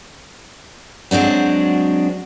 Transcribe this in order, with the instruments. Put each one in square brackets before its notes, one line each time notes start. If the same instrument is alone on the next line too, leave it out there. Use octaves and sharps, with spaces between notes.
[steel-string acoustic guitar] F#3 G#3 C4 D4 F#4